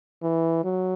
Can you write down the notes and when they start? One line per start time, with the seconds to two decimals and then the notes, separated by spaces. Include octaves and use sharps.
0.23 E3
0.64 F#3